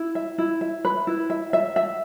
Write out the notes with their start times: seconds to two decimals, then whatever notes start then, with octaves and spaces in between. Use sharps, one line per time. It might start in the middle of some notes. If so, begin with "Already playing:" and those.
Already playing: E4
0.15 E5
0.38 E4
0.61 E5
0.85 B4
1.07 E4
1.30 E5
1.53 E5
1.76 E5